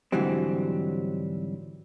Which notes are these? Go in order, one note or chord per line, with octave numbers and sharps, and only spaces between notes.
G#2 D3 E3 F#3 G3 C4